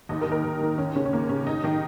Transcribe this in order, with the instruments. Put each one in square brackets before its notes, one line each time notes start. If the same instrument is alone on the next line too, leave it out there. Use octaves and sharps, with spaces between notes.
[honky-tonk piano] D#2 D#4
A#4
D#3
A#4
D#2
D#3
D#2 C#4
C#3 C#4
C#4
D#2 A#3
C#3 C#4
D#2 D#4
D#3 D#4